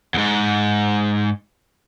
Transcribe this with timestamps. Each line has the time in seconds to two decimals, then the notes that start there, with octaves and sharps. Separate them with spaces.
0.14 E2 G#2